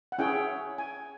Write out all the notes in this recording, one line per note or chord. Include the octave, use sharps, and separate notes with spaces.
F#5
C#4 E4 G#4 C#5 G5
G#5